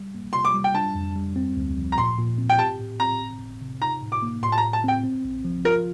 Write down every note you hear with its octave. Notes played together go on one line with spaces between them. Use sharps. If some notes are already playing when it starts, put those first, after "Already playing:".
Already playing: G3
A#3
C3 C6
D6
G3
G5
D4 A5
F2
G3
C4
D2
F3
A#5
A#2 C6
A#2
C4
G5
G4 A5
A2
C4 A#5
G1
G1
C3
D#4 A#5
A2
D6
A#3
A2 C6
A5
A#5
A2
A5
C4 G5
C4
A#1
F3
F4 A#4